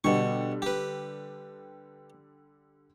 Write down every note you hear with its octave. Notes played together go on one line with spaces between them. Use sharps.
B2 D3 G3 C#6
G4 B4